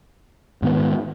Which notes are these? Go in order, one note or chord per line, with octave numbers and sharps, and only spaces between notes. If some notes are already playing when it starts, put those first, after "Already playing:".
G#2 D#3 B3